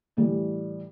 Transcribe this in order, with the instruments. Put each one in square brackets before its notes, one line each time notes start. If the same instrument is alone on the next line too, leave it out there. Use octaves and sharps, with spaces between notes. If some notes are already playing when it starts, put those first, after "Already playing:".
[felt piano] A2 E3 G3 G4